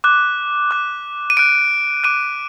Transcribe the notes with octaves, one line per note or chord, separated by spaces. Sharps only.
D6 F#6
D6 F#6
D#7
D6 F#6 D7
D6 F#6 D#7